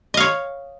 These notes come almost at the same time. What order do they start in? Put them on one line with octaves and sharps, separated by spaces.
D#5 F5 C#5